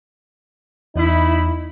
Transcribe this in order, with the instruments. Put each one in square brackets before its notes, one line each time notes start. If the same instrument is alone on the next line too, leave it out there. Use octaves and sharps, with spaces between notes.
[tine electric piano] E2 [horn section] D#4 E4